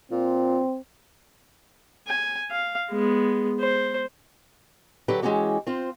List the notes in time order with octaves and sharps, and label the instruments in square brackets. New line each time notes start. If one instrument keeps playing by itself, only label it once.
[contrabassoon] A#2 [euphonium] C4
[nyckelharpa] G#5
F5
G#3 B3
C5
[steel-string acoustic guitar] D3 F#3 G4 B4
E3 G#3 A#3 C#4 F#4 G4
C4 F4 C5